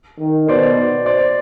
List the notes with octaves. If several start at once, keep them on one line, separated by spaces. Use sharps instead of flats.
D#3
B2 C5 D5
C5 D5